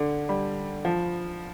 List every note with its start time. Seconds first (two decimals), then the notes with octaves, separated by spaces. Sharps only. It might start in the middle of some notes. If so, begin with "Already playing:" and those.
Already playing: D3
0.29 G3
0.85 F3